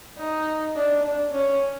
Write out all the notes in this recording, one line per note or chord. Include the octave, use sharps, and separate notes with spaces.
D#4
D4
D4
C#4